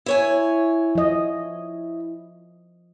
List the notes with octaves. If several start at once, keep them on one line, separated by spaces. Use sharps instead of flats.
E4 C#5 G#5
F3 D#5